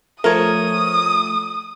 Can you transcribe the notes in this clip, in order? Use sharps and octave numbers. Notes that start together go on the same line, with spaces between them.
F3 A3 A#4 C#5 D#6